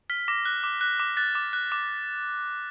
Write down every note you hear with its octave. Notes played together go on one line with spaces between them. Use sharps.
F6 B6
D6 A#6
F#6
D6
F#6
D6
F#6 A6
D6
F#6
D6